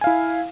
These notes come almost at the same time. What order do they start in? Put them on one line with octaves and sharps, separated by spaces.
G#5 F5 E4